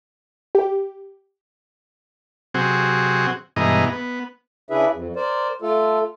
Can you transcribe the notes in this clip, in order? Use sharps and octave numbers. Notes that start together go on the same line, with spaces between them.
G4
C3 F#3 C4 F#4 G#4
G2 B2 E3 G#3 D#5 A#5
B3
C#3 D4 E4 G#4 B4 E5
F2
A#4 C5 D5
A3 F4 A4